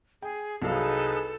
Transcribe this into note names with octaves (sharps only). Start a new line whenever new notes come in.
G#4 G5
C2 F#3 D#4 G#4 A4 B4 F5